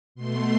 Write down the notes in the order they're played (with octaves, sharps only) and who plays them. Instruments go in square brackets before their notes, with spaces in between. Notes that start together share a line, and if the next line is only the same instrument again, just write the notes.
[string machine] B2 A3 C6